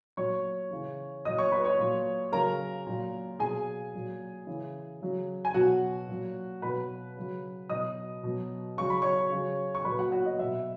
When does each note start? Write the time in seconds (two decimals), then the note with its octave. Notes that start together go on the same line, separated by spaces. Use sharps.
0.17 A#2 F#3 C#5 C#6
0.71 C#3 E3
1.25 A#2 F#3 D#5 D#6
1.38 C#5 C#6
1.52 B4 B5
1.65 C#5 C#6
1.78 A#2 F#3
2.32 C#3 F#3 A#4 A#5
2.86 A#2 F#3
3.39 B2 F#3 G#4 G#5
3.94 A#2 F#3
4.47 C#3 E3
5.02 C#3 F#3
5.45 G#5
5.54 B2 F#3 F#4 F#5
6.08 A#2 F#3
6.62 B2 F#3 B4 B5
7.16 C#3 F#3
7.69 B2 F#3 D#5 D#6
8.23 B2 F#3
8.77 C#3 F#3 C#6
8.90 B5
9.02 C#5 C#6
9.31 C#3 F#3
9.75 C#6
9.85 A#2 F#3 B4 B5
9.98 F#4 F#5
10.12 F#4 F#5
10.26 D#5
10.38 B2 F#3 E5